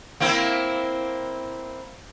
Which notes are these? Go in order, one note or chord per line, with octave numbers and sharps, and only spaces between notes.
A#3 C4 E4